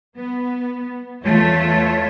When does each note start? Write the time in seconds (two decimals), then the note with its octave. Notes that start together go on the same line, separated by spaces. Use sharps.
0.17 B3
1.24 E2 A3 F4 C#5 E5